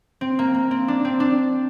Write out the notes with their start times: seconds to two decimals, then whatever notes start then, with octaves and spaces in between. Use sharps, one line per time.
0.21 C4
0.39 A#3
0.54 A#3
0.71 C4
0.88 D4
1.05 C4
1.20 D4